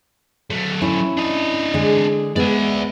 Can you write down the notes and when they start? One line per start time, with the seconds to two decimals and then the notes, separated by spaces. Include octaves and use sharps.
0.50 F#3 A3
0.82 C#4 E4
1.17 D4 D#5
1.74 D3 G#3 G#4
2.36 G#3 B3 D5 E5